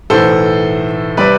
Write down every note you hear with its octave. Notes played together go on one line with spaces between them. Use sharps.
B1 A2 E3 A4 C5
C3 G3 B4 D5